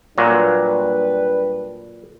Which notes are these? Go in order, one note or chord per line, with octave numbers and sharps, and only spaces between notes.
A#2 F#3 G3 D4 B4